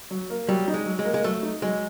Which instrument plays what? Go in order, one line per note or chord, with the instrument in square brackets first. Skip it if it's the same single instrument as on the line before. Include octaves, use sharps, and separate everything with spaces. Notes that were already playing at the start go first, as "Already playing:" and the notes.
[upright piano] F#3
A#3
[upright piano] F#3 [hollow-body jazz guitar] G3
[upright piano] D#4
[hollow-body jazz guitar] G#3
[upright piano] F#3
[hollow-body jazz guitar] G#3
[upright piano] A#3
[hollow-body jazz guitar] G#3
[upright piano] F#3 [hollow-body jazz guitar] A3
[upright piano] D#4
[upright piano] F#3 [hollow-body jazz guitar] G#3